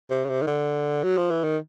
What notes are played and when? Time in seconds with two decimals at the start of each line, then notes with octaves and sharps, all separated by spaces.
0.11 C3
0.25 C#3
0.29 C3
0.42 D#3
0.47 D3
1.04 F#3
1.17 F3
1.31 E3
1.44 D#3